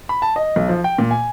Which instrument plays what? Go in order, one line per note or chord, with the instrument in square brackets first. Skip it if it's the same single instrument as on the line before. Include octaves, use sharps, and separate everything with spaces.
[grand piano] B5
A5
D#5
B1
F3
G5
A#2
G#5